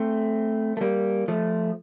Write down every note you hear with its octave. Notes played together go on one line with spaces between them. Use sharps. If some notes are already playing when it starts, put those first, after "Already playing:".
Already playing: A3 C4
A3
G3 A#3
F3 A3